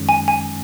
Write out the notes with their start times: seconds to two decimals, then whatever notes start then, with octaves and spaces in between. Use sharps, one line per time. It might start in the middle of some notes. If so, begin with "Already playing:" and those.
Already playing: F#2 D#3 G#3 C#4
0.09 G#5
0.28 G#5